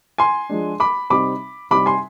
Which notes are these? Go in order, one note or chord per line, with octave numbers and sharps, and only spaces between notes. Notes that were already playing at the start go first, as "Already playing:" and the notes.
G#5 C6
F3 G#3 D4
B5 D6
C3 G3 C4 D#4 B5 D6
C3 G3 C4 D#4 B5 D6
G#5 C6